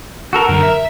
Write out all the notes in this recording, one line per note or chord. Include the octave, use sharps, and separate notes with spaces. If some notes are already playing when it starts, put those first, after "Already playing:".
F#4 A4 A#4
F#2 D3 A#4
E5